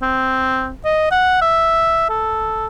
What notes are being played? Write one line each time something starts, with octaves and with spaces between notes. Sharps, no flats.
C4
D#5
F#5
E5
A4